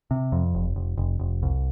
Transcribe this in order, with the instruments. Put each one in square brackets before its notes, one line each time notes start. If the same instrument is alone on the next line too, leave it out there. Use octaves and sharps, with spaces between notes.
[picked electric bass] C3
F2
F1
F1
F1
F1
C2